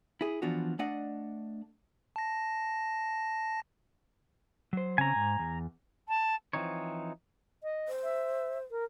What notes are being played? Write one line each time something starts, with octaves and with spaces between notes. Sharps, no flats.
E4 G#4
E3 F3 B3 D4 F4 F#4
A3 D4 D5 D#5 F#5
A5 A#6
F#3 C5
C#3 C4 C#4 G#5 A#5
G#2
E2
A5
E3 F3 C4 D#4 C#5
D#5
C5
E5
A#4